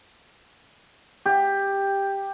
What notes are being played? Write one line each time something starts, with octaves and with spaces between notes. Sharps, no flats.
G4